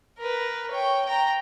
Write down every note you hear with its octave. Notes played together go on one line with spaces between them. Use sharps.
A#4 B4
C#5 G5
G5 A#5